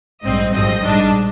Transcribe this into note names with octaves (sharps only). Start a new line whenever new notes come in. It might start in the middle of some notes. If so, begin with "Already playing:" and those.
A#1 G#2 G3 C4 D#5
G#1 G2 F3 C4 D#5
A#1 G#2 G3 D4